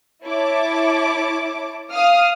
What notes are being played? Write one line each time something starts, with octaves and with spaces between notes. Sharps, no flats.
E4 C#5 A5 D6
F5 D#6 F6